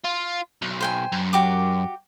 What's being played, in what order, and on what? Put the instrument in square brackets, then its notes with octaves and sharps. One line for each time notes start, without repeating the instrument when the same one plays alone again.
[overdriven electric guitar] F4
B1
[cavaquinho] C5 G5 G#5
[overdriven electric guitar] F#2
[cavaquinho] F#4 G4 D6